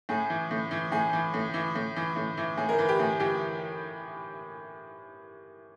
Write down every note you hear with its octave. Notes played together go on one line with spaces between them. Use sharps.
A2 G#4
E3
A2
E3
A2 G#4
E3
A2
E3
A2
E3
A2
E3
A2 G#4
A#4
E3 B4
G4
A2 G#4
E3 G4